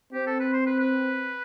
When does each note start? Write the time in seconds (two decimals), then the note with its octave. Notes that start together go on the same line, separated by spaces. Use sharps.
0.14 C4 G4
0.27 A4
0.40 B4
0.54 C5
0.66 B4
0.80 B4